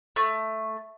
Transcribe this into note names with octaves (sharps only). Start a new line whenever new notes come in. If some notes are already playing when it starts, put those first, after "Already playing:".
A3